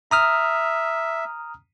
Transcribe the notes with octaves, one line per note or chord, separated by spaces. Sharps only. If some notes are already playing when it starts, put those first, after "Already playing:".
E5 A#5 D#6 F6